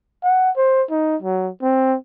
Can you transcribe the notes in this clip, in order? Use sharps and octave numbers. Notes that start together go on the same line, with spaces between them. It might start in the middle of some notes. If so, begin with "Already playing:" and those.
F#5
C5
D#4
F#3
C4